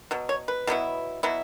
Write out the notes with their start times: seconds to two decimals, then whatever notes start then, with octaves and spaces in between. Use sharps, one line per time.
0.11 B2 F#3
0.29 C#5
0.48 B4
0.67 B2 F#3 B3 E4
1.23 B2 F#3 B3 E4